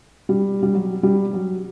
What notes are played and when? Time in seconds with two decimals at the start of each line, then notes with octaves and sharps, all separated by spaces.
0.29 G3
0.63 G3
0.74 F#3
1.03 G3
1.33 F#3